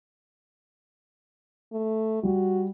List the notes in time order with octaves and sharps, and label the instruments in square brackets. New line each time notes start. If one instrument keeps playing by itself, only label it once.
[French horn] A3
[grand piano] G3 [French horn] F#4